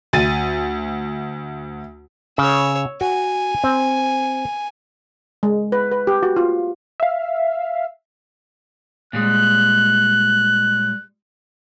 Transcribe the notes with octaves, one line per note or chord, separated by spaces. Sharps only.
D2 A6 D#7
C#3 C#5 E6
F#4 G#5
C4
G#3
B4
B4
G4
F#4
F4
E5 F5
A#2 G3 G#3 F#6